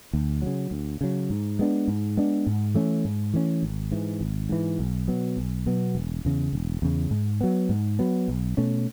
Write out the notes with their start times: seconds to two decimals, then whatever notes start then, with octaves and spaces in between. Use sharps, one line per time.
0.13 D2
0.42 C#3 F#3
0.71 D2
1.01 C#3 F#3
1.30 G#2
1.59 G#3 B3 D4
1.88 G#2
2.17 G#3 B3 D4
2.47 G#2
2.74 E3 A3 C#4
3.05 G#2
3.34 E3 A3 C#4
3.63 G#1
3.91 G#2 E3
4.21 G#1
4.49 G#2 E3
4.79 B1
5.08 B2 F#3 B3
5.37 B1
5.66 B2 F#3 B3
5.95 E1
6.25 E2 C#3
6.53 E1
6.82 E2 C#3
7.11 G#2
7.41 F#3 B3
7.69 G#2
7.99 F#3 B3
8.28 B1
8.57 B2 A3 C#4